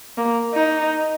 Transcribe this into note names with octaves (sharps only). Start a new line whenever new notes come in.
A#3
D#4